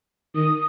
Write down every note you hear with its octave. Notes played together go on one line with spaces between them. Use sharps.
D#3 D#6